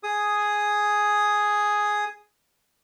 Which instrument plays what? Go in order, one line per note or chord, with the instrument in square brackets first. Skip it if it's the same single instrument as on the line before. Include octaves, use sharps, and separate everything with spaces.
[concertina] G#4 D#6